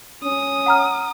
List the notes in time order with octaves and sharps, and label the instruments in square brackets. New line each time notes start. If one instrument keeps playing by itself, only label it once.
[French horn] C#4 [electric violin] D#6
[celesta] F#5 A#5 F6